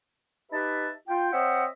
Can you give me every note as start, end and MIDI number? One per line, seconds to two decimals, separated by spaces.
0.52 0.90 63
0.52 0.90 67
0.52 0.90 71
0.52 0.90 76
0.52 0.90 81
0.52 0.90 83
1.08 1.29 65
1.08 1.29 79
1.33 1.65 60
1.33 1.65 72
1.33 1.65 73
1.33 1.65 75
1.33 1.65 76
1.33 1.65 78